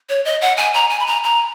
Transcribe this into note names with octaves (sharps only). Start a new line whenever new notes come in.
C#5
D#5
F#5
G#5
A#5
G#5
B5
A#5
A#5